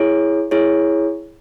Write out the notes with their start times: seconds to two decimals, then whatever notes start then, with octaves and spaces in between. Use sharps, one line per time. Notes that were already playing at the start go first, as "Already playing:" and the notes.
Already playing: E4 G#4 C#5
0.51 E4 G#4 C#5